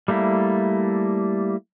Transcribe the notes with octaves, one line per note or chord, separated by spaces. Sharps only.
G3 A3 A#3 E4